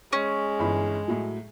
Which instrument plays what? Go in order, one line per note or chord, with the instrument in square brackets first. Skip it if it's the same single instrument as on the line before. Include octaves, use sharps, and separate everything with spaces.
[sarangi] G#3 [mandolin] C#4
[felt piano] G1 E3 B5
A2 F#3